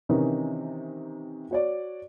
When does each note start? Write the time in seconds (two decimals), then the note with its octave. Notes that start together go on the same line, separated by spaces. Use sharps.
0.09 C3 D#3 E3 C#4 D#4
1.51 F#4 C#5 D5